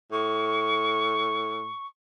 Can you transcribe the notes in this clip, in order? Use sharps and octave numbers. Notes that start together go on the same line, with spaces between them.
A2 C#6